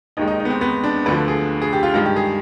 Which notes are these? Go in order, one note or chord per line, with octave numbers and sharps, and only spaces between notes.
D#2 D#3 G#3 D#4
D#4
D#4
B3
C4
B3
D4
D2 D3 F3 B4
G#4
G#4
G4
F4
G2 D#3 G#3 F4
G4
G#4